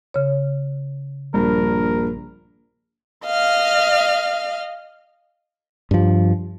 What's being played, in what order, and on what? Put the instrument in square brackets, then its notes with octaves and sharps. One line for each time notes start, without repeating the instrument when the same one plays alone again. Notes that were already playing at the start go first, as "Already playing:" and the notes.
[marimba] C#3 C#5
[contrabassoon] A#1 [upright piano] G2 [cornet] A#4
[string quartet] D#5 F5 F6
[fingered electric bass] G2 F3